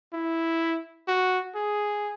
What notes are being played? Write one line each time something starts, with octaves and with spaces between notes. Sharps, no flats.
E4
F#4
G#4